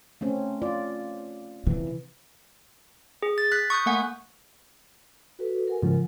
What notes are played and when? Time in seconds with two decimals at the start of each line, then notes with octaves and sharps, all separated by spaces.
0.21 A3 C4 C#4
0.62 F4 D5
1.67 C3 E3
3.23 G#4
3.38 A6
3.52 F#6 B6
3.70 C#6 D#6 F#6 G6
3.86 A3 A#3 F#5 G#5
5.39 F#4 A4 B4
5.68 A#4 F#5 G#5
5.83 G#2 C#3 F3